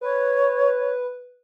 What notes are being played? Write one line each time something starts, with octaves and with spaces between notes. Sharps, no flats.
B4 C#5